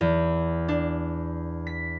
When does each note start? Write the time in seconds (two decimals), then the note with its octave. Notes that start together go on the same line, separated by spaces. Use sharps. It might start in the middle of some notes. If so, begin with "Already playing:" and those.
0.01 E2
0.68 D4
1.67 B6